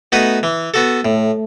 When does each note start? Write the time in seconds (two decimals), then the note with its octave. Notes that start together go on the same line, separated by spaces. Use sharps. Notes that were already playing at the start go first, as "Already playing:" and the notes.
0.12 A3 B3 D#4 F#4 B4
0.43 E3
0.74 B3 F#4 A4
1.04 A2 A3